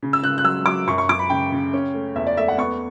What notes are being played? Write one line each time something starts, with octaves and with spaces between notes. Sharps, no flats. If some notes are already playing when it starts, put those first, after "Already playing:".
C#3
E6
C#3 F#6
F#6
F#3 E6
F#3 D6
F#2 C#6
C#6
F#2 D6
B5
C#3 G5
C#3
C#4
A3
E2 E5
D5
A3 E5
F#5
B3 C#6